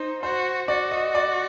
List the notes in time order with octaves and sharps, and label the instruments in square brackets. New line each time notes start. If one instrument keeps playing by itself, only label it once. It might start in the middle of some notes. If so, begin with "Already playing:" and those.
Already playing: [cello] D#4 [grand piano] C5
[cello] F#4 [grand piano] C5
[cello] F#4 [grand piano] D5
[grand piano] D#5
D5